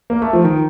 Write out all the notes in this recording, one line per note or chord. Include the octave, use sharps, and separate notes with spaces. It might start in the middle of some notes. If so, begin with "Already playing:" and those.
A#3
A3
F3
D#3